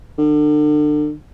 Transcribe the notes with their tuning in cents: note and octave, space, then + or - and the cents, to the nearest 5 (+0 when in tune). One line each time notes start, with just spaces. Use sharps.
D3 +35